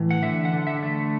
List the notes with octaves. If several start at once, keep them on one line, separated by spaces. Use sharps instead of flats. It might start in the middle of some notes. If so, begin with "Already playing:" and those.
Already playing: A2 E3
F#5
D3 E5
F#5
D3
E5
A3